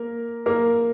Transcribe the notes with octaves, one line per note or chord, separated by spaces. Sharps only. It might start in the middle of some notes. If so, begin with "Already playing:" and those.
Already playing: A#3 A#4
A#3 A#4